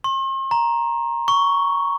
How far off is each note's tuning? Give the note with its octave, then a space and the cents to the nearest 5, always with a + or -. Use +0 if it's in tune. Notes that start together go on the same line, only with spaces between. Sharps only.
C6 +45
A#5 +10
C#6 +5